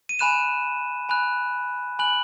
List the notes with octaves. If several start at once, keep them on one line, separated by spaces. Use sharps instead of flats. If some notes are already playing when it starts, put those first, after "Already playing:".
D#7
G#5 B5 F#6 E7
G#5 B5 F#6
G#5 B5 F#6 F#7